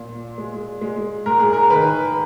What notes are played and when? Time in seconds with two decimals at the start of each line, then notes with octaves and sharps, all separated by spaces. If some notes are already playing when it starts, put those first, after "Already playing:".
Already playing: A#2
0.38 G#3
0.81 G#3
1.26 G#2 A#4
1.40 G#4
1.53 A#4
1.70 D#3 B4